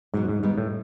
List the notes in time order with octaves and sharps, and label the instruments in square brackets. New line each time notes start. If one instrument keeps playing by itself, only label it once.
[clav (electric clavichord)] G#2 [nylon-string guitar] B2 F#3 A3
[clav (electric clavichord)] G#2
[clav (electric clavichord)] G#2 [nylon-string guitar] D#3 G3 B3 D#4
[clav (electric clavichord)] A2